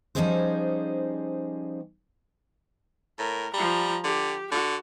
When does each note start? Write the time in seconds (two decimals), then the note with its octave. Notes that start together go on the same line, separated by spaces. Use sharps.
0.15 F3 G3 C#4 D#4 G#4 C5
3.19 A2 A#4
3.54 F3 G3 A#5
4.04 D3 G4
4.52 D3 F#4